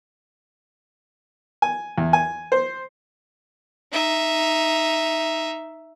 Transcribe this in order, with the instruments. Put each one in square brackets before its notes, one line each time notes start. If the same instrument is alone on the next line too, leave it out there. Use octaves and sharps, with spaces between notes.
[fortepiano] G#5
E2
G#5
C5
[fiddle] D#4 E5